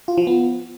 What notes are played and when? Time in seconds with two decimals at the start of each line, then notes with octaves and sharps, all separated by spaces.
0.08 F4
0.18 F3
0.27 B3